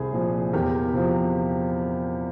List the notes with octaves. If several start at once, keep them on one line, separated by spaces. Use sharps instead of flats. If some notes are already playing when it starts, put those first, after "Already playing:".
Already playing: C2 G#4
A#2 F3
E2 G4 A#4
C3 F3